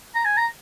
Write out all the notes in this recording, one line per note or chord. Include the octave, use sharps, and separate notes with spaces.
A#5
G#5
A#5